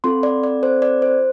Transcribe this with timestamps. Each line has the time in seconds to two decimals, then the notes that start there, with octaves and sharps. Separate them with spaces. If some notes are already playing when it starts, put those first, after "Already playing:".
0.04 C4 F4 A4 C6
0.23 D5
0.43 D5
0.63 C5
0.82 D5
1.02 C5